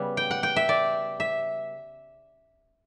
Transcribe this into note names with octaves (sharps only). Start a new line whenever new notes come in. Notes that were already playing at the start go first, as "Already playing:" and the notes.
Already playing: C#3 G3 B3
G5
F#5
G5
E5
D5
E5